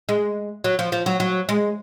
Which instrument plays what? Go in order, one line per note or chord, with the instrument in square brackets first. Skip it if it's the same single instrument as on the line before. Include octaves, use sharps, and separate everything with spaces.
[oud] G#3
F#3
F3
F3
F#3
F#3
G#3